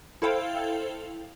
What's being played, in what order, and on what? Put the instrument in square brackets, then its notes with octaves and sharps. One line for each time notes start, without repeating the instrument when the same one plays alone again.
[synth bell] E4 A4 C5 F5 G5